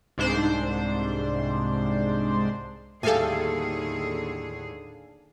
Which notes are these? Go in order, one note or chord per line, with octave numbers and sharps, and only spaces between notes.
C2 G#2 D4 C5
D#2 A2 D3 G3 G#4 A4 F5 G#5